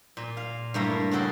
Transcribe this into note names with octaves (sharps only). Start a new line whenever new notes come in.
A#2
F5
G2 A3 A#3 E4
C#3 F#4 G#4 A4 G5 B5